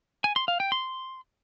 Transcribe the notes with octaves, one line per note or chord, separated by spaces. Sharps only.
G#5
C6
F5
G5
C6